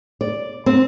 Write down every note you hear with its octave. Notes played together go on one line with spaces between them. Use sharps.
D5
C4